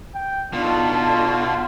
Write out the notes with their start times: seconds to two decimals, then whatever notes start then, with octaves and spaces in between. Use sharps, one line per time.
0.15 G5
0.54 B2 D4 D#4 F4 A4